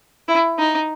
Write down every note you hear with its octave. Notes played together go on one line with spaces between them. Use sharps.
E4
D#4